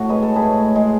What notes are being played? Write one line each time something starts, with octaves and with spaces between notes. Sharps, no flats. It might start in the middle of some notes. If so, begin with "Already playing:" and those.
Already playing: A2 F#4 C#5
G#3 B4
A4
G#4 B4
A2
G#3